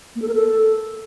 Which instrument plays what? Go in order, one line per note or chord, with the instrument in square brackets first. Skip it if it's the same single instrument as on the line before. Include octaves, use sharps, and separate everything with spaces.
[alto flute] A#3
A4
A#4
A4